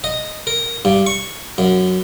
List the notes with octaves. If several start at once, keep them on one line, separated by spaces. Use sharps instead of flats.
D#5
A#4
G2
C#6
F#2